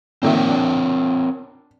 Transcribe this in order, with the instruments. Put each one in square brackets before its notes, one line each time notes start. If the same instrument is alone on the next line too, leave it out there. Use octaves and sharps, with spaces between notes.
[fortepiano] A#2 D#3 E5 [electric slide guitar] C4 A#4 C#5
[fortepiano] D4